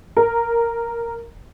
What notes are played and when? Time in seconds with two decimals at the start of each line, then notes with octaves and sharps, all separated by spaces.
0.17 A#4